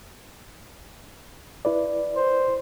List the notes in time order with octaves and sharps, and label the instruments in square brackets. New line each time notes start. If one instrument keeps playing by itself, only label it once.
[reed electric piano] E4 B4 D5
[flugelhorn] C5